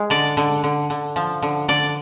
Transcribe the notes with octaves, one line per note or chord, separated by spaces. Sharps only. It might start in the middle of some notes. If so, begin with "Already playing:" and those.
Already playing: G#3
D3 D5
D3
D3
D3
F3
D3
D3 D5